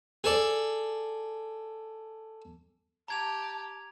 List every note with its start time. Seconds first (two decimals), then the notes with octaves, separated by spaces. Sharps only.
0.24 G#4 A4 D5
3.08 G4 A5 A#5 G#6 F7